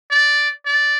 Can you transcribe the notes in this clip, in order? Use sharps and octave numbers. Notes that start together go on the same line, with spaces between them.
D5
D5